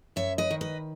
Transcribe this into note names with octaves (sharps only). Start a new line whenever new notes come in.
F#2 C#5 E5
B4 D#5
D#3
B4 D#5